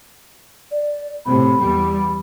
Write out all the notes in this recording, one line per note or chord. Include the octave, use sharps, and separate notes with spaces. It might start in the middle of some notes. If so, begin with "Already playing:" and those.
D5
A2 C3 B5
E2 G3